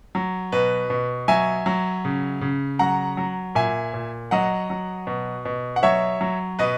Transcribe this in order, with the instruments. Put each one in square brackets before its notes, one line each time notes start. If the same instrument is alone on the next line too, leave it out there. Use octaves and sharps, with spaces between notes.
[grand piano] F#3
B2 B4
B2
F#3 E5 G#5
F#3
C#3
C#3
F#3 F#5 A#5
F#3
A#2 E5 G#5
A#2
F#3 D#5 F#5
F#3
B2
B2
F#5
F#3 C#5 E5
F#3
B2 B4 D#5